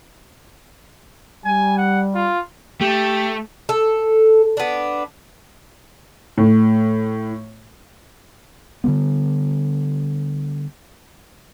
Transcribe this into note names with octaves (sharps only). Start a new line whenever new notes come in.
G3 G#5
F#5
F4
A3 G4
A4
B3 D4
A2
D3 F#3 G3 B3